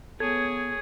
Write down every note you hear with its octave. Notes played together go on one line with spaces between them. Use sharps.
B3 G#4 A4 C#5 G#6